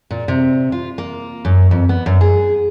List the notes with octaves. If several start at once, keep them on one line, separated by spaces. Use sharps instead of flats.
A#2
C3
F4
A#3
F#2
F2
B3
F#2
G#4